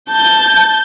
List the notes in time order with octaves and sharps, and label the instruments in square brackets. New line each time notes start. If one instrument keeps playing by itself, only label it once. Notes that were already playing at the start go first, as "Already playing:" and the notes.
[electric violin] A5 [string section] G6